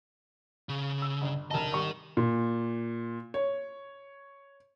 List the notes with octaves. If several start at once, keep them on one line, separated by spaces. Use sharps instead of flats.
C#3
E6
G1
F1 D2 A#4 D#5 A5
G#1 G3 C#6
A#2
C#5